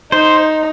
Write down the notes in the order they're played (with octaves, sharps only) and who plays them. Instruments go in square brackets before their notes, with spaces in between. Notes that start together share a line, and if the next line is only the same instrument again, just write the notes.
[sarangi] D#4 [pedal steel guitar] C5